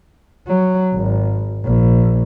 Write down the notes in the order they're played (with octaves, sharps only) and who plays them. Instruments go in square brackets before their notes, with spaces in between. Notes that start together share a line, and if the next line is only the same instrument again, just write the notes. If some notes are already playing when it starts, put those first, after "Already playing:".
[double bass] F#3
G#1
A#1